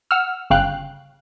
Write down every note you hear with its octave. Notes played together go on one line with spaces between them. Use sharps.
F#5 E6 F6
G1 C#3 F5 G5 F#6